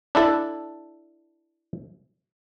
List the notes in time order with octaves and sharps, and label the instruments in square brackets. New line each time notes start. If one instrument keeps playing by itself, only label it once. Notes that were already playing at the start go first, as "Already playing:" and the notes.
[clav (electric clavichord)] D4 E4 A4